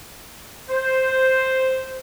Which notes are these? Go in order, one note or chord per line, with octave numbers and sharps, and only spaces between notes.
C5